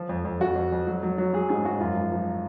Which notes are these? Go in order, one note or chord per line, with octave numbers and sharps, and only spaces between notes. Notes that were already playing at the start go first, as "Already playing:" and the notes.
Already playing: F3
F2
F2
F2 F#4
F2
F2
F#3
F#3
F#3
F#3 G#4
G#2 G#4
G#2 F#4
F#2 F4
F3
F3